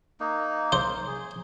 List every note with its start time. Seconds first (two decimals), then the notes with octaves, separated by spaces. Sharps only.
0.20 A#3 D#4
0.72 C5
1.07 G#4